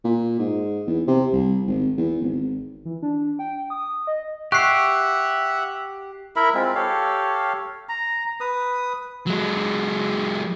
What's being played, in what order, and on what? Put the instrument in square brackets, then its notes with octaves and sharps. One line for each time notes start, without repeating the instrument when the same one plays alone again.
[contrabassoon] A#2
G#2
E2
C3
C2
G#1
E2
G#1
[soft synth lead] E3
D4
G5
D#6
D#5
[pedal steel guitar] G4 [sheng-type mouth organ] E5 F#5 [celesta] C#6 [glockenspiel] F#6 C7
[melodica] E4 A#4 E5 B5
G#3 C4 F4
G4 A4 C#5 F5
A#5
B4 D#6
[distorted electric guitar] F#3 G#3